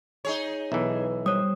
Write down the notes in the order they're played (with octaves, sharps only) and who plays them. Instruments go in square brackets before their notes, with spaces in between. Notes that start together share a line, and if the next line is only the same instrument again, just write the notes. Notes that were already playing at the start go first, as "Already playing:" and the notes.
[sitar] D#4 G#4 C#5
[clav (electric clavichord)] B1 E3 [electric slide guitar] E5
[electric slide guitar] G3 C5 [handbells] C#5 D#6